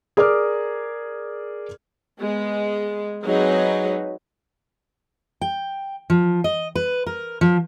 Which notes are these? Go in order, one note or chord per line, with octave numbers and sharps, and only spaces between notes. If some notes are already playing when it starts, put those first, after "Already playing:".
G#4 A#4 D5 D6 F6
G#3 B3
F#3 G#3 C4 D#4 G#4 B4
G5
F3
D#5
B4
A#4
F3